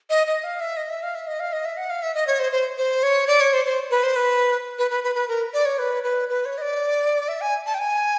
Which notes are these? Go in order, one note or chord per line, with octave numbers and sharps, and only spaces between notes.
D#5
D#5
F5
E5
D#5
E5
F5
E5
D#5
F5
D#5
E5
F#5
F5
E5
D#5
C#5
C5
C5
C5
C#5
D5
C#5
C5
C5
B4
C5
B4
B4
B4
B4
B4
A#4
D5
C#5
B4
B4
B4
C#5
D#5
D5
E5
G#5
A5
G5
G#5